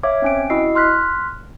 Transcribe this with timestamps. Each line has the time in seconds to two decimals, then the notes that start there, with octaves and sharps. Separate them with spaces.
0.03 C#5 E5 F5 D6
0.22 C4 C#4 D7
0.50 E4 F#4 D#5 E6 C7
0.75 C6 F6 F#6 B6